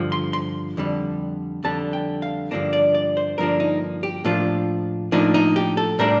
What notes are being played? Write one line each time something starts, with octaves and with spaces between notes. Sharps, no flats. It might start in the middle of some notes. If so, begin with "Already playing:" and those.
Already playing: G2 D3 F3
C6
C6
F2 D3 G3
F2 D3 G3 A5
G5
F5
G2 D3 F3 A#3 D4
D5
D5
C5
G2 D3 F3 A#3 D4 A#4
D#4
G4
A2 F3 A#3 D4 F4
A2 F3 A#3 D4 D#4
D#4
G4
A4
A2 G3 A#3 D4 A#4